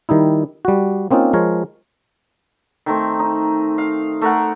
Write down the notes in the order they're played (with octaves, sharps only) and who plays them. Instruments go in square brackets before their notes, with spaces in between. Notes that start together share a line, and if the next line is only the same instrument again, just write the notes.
[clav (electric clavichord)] D#3 G3 D#4 E4
G3 F#4
A#3 C4 C#4 D#4 F4
F3 G#3 A#4 C#5
[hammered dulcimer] D#3 A3 C4
D#4
F5
A3 A#4 F#5